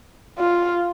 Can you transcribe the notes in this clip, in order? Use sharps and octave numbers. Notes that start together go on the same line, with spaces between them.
F4